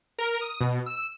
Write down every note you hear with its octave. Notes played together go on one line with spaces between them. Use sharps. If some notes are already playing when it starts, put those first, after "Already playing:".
A#4
D#6
B2
E6